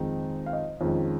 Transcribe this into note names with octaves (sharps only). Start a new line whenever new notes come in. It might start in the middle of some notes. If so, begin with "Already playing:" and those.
Already playing: F2 D#3 G#3 C4 D#4
F5
D#5
F2 D#3 G#3 C#4